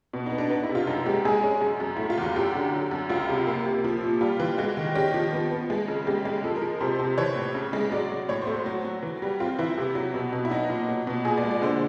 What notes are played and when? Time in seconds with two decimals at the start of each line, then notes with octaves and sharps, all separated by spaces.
0.13 B2
0.26 D#4
0.32 B3
0.38 D4
0.50 B3 D#4
0.63 E4
0.69 C3
0.75 F4
0.87 F#2 D#4
1.06 G#3 G4
1.25 G#3 G#4
1.44 C#4
1.61 F#2
1.80 F#2
1.96 A3 E4
2.10 F4
2.18 E2 F#4
2.36 F#2 G4
2.55 D3
2.73 F#3
2.91 F#2
3.10 C#2 F4
3.29 C3
3.47 A#3
3.66 C3
3.84 F3
4.03 A#2
4.21 G3 F4
4.40 E3
4.58 G#3 F#4
4.77 D#3
4.95 C#4 G4
5.14 F3
5.33 B3
5.51 B3
5.70 G#3
5.88 C#3
6.07 G#3 G4
6.25 G#3
6.44 F3 A4
6.56 A#4
6.62 F3
6.81 C3 C5
6.99 C3
7.18 E3 C#5
7.36 A2
7.55 C#3
7.73 G#3
7.92 F#3 D5
8.10 F#3
8.29 A2 C#5
8.42 C5
8.47 A3
8.54 F#4
8.66 F#3
8.84 F#3
9.03 E3
9.22 G3
9.40 C4 F4
9.59 E3 E4
9.78 C3
9.95 F#3
10.14 B2
10.33 B2
10.45 E4
10.51 F#3 D#4
10.70 A#2
10.89 F#3
11.07 B2
11.25 A#2 G#4
11.37 D5
11.43 G#3
11.51 D5
11.62 D3 C5